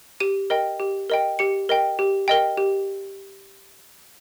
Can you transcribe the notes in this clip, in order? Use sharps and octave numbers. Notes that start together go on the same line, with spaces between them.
G4 D#7
A#4 D#5 G5
G4
A#4 D#5 G5
G4 C#7
A#4 D#5 G5
G4
A#4 D#5 G5
G4